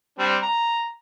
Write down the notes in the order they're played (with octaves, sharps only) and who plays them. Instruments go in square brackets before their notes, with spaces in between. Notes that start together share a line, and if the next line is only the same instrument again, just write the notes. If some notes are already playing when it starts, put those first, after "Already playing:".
[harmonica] G3 C4 D4
A#5